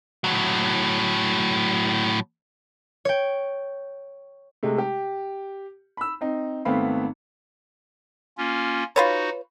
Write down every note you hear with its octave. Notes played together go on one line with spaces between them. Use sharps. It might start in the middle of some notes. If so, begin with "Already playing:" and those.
A2 F#3
C#5 G5
C3 G#3 A3
G4
B5 E6
C4 D#4
G#1 A3 B3 C4 F5 B5
A#3 C#4 F4
D#4 F4 F#4 B4 C#5